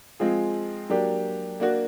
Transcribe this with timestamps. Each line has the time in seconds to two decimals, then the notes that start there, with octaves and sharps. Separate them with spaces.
0.19 F3 G#3 C4 F4 G#4
0.90 F#3 A#3 D4 G4
1.60 A#3 D4 F#4